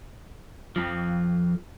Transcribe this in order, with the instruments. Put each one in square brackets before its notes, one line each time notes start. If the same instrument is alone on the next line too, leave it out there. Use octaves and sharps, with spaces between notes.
[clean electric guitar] F2 F3